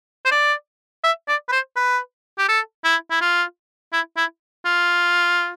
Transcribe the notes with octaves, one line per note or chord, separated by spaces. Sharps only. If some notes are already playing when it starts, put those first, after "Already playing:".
C5
D5
E5
D5
B4
C5
B4
G4
A4
E4
E4
F4
E4
E4
F4